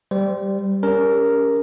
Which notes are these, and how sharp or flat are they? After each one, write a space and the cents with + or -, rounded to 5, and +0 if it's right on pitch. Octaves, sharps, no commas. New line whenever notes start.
G3 +0 C5 -20
C#4 +35 G4 +30 A#4 +0